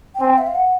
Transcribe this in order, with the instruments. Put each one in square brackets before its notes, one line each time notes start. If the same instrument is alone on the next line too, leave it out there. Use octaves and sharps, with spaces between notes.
[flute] G5
[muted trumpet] C4 [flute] G#5
[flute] G5
E5
F5
F#5